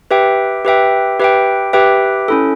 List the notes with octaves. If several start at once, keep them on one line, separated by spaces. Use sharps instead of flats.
G4 B4 E5 G5
G4 B4 E5 G5
G4 B4 E5 G5
G4 B4 E5 G5
C#4 E4 A4